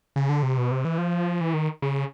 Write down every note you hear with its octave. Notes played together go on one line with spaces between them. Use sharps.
C#3
D3
C3
B2
C3
E3
F3
E3
D#3
C#3